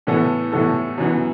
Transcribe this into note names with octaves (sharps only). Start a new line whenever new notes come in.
A2 E3 B3 A4
A2 E3 B3 A4
F#2 E3 B3